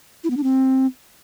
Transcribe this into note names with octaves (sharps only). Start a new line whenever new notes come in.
E4
B3
D4
C4